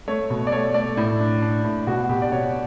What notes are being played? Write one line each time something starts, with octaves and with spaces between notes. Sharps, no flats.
A3 C#5
B2
D5
A3 C#5
A3 D5
A2
D4
D4
A2
B2 F#4
B2 G4
D5
B2 C#5